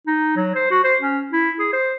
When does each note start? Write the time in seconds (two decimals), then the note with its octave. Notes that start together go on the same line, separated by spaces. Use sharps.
0.07 D#4
0.36 F#3
0.55 C5
0.71 F#4
0.84 C5
1.01 C#4
1.32 E4
1.59 G#4
1.73 C5